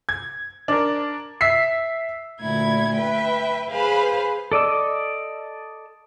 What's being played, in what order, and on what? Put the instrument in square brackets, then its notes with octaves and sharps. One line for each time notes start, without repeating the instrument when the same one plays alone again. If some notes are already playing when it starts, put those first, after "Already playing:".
[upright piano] G#6
D4 A#4
E5 E6 B6 C7
[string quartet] D2 A#2 E4 G#6
B4 E5 G5
G#4 B4 C5 F5 B5
[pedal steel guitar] A4 D5 D#5 E6